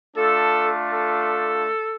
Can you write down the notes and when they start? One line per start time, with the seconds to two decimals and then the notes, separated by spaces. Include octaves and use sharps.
0.16 A3 D4 F4 A4
0.93 A4